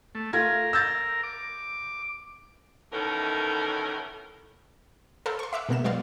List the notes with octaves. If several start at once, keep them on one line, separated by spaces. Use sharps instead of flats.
A3
A3 F4 A#4 G#6
E6 G6 A6
D6
B2 D#3 E3 C#4 A4 A#4
A4 A#4 C5 F5 A5 B5
C6 C#6
E5 D6 E6 F#6
B2 G#3 A#3 B3 F6 E7
F#3 G#3 B3 C5 D5 F5